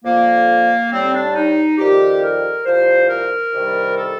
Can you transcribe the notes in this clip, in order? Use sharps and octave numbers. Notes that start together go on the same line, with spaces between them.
F2 D3 F3 A#3
A2 G3 C4
D4
D#4
F2 D#3 G3 G4
A#4
C2 C3 F3 C5
A#4
C2 C3 D#3 G3
A4